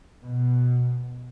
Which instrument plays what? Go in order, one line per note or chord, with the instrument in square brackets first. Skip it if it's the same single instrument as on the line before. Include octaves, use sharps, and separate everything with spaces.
[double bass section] B2